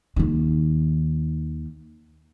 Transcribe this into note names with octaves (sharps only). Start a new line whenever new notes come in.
D#2 D#3